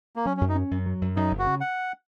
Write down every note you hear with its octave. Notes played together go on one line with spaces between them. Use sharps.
A#3
F#3 C#4
C#4
F#2
D#4
C#4
F#2
F#3
F#2
F#2 D#4
F#1
F#4
C#3
F#5